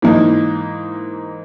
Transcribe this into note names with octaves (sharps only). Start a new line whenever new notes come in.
G#2 E3 A#3 D#4